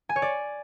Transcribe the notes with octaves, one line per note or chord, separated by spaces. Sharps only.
G#5
C#5
D5